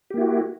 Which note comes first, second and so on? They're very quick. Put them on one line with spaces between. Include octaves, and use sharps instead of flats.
G4 A#3 E4 F#4